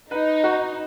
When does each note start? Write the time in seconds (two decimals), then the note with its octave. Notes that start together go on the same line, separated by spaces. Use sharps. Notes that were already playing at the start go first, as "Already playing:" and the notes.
0.11 D#4 B4
0.44 F#4